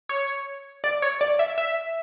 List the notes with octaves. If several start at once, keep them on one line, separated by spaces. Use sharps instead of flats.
C#5
D5
C#5
D5
E5
E5